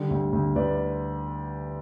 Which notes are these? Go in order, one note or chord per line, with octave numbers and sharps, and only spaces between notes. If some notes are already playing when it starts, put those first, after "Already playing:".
Already playing: D3 G3
D2
D2
D2 B4 D5